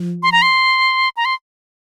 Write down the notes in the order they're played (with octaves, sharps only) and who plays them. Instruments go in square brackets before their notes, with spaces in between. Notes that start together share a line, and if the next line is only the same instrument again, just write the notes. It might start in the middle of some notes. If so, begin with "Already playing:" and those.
Already playing: [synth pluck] F3
[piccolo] C6
A#5
C6
A#5
C6